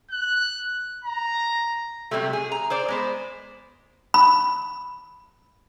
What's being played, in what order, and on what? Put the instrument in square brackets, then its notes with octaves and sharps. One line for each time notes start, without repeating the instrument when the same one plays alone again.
[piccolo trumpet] F#6
A#5
[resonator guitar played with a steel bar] C3 D#3 F#3 G3 A3
G#4
A#5
G#4 C5 D5
G#3 B3 C5
[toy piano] B5